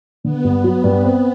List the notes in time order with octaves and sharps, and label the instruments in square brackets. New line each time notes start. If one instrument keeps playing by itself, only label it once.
[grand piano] D3 [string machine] B3
[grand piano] G2
F#3
G2
C4